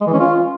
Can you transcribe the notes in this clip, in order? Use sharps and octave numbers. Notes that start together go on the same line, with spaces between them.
G#3
E3
C#4
F4